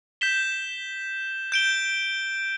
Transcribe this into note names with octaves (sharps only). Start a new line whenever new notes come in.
G6 B6 E7 G7
G6 D7 G7